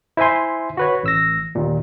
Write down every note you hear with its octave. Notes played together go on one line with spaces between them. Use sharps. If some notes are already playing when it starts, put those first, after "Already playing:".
E4 C5 E5 G#5 C6
F#4 B4 C#5
A1 E6 A#6
D#2 A#2